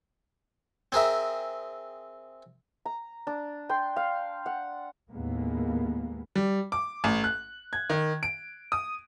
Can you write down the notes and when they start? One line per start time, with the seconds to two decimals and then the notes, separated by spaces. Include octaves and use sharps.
0.92 C4 G#4 A#4 E5
2.85 A#5
3.27 D4
3.69 G5 C6
3.96 F5
4.46 F#5
5.11 D#2 A2 G#3 A#3 B3
6.35 G3
6.72 D6
7.04 A1
7.24 F#6
7.73 G#6
7.90 D#3
8.23 D7
8.72 D#6